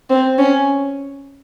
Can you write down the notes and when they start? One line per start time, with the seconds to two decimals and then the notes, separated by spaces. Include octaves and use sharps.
0.10 C4
0.38 C#4